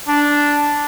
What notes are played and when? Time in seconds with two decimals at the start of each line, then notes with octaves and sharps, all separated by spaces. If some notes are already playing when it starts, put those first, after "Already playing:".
0.08 D4